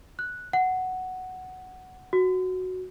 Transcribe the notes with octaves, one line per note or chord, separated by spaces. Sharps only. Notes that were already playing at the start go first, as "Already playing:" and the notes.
F#6
F#5
F#4